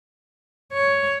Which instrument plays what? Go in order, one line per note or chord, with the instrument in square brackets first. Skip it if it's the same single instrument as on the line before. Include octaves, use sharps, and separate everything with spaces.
[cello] C#5